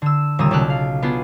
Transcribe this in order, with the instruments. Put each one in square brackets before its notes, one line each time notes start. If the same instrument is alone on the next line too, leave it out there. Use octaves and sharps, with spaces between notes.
[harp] D3 E6
D#1 C#3 G3 A#5 D#6 E6
B1 C#3 A4 D5 F6 F#6
F5
B3 D4 F4 G#4 D5